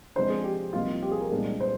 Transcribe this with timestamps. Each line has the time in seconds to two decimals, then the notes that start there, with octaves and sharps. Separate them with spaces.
0.15 C3 F3 G#3 D4 C5
0.30 G#4
0.44 G4
0.73 C2 C3 F3 A#3 D#4 F4
1.03 G4
1.12 G#4
1.21 A#4
1.31 C2 A#2 G#3 D4 G#4
1.60 C5